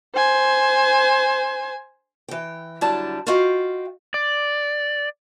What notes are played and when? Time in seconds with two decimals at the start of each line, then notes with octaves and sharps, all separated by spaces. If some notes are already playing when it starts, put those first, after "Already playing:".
0.15 C5 G#5
2.28 E3 G5
2.81 D3 F#3 G3 E4 D5 A5
3.27 F4 F#4 D#5 F5 G5
4.14 D5